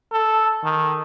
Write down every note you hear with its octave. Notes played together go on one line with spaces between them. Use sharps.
A4
D#3